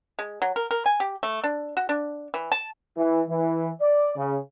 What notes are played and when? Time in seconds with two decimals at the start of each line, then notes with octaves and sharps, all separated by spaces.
0.19 G#3
0.42 F#3
0.56 A#4
0.71 A#4
0.86 G#5
1.00 G4
1.23 A3
1.44 D4
1.77 F#4
1.89 D4
2.34 E3
2.52 A5
2.97 E3
3.28 E3
3.80 D5
4.16 C#3